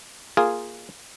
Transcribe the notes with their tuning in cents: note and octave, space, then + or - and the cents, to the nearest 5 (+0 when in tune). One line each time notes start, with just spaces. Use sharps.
A#3 +0 F4 +0 G#4 -5